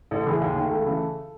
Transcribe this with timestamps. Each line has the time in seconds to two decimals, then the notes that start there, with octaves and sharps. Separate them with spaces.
0.11 A1 A3 A4
0.26 A2 E3 G#4
0.41 D#2
0.56 D#3 A3
0.71 C#2 A3 A4
0.86 C#3 E3 A3